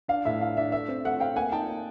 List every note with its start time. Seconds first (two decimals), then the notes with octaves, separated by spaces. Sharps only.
0.08 D4 F5
0.25 A2 E5
0.40 D4 F5
0.57 D4 E5
0.72 A3 E5
0.88 C4
1.05 A3 E5 F#5
1.20 C4 F5 G5
1.36 A#3 F#5 G#5
1.52 D#4 G5 A5
1.69 A#3